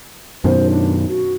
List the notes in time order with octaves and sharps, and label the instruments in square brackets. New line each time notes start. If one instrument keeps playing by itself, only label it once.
[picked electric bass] F#2 B2 D#3 [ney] C5
[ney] D4
F#4